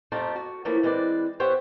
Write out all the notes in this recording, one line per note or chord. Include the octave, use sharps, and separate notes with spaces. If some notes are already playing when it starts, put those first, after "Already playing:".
F2 A3 F4 G4 A#5
F#4
E3 F3 A3 A#3 C#4 E4
E3 G#3 C4 B4 D5
B3 G4 C5 C#5 E5 F#5